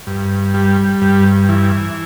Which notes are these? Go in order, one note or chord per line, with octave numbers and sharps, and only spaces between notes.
G2
G3
G2
E3